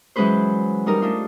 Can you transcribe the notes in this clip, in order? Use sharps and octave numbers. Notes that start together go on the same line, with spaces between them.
E3 F#3 G#3 C#4 B4 C5
G3 D#4 A#4
A3 D4 D#4 F4